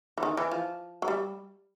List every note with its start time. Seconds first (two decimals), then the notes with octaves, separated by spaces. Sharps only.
0.18 E3
0.23 D#3
0.37 E3
0.51 F3
1.02 F#3
1.08 G3